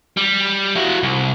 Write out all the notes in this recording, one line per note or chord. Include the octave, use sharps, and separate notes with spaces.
G3
E4 F#4
C2